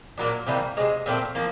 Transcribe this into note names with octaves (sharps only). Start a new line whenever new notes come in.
A#2 F#3 A#3 D4
C3 E3 G3 A#3
C3 E3 G#3
A#2 F3 A3 C4
F3 A#3